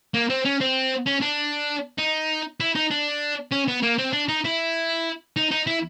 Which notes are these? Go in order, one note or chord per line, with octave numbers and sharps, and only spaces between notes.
A#3
C4
C#4
C4
C#4
D4
D#4
E4
D#4
D4
C#4
B3
A#3
C4
D4
D#4
E4
D#4
D#4
E4